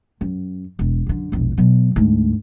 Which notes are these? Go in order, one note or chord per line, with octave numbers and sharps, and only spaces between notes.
F#2
E1
F#2 D3
E1 A#1
B2 F#3
D2 G#2